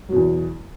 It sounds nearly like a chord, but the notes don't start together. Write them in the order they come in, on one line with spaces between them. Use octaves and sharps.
F#3 B2 E2